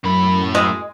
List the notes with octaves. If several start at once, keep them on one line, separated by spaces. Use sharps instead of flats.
F#2 A2 B5
G#3